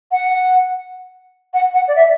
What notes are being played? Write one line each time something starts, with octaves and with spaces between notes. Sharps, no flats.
F#5
F#5
F#5
D5
E5